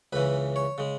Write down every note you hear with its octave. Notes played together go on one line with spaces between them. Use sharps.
C#2 C#3 E3 B4
C#5
C#3 G#3